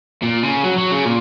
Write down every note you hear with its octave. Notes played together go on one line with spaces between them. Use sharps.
A#2
C#3
F#3
F#3
C#3
A#2